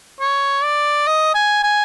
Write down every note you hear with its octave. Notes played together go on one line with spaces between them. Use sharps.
C#5
D5
D#5
G#5
G#5